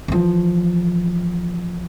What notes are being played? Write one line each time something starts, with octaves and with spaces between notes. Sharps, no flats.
E3 F3